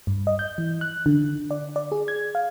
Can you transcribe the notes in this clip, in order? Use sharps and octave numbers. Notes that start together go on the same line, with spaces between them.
G2
D#5
G6
E3
F#6
D3
D5
D5
G#4
G#6
F5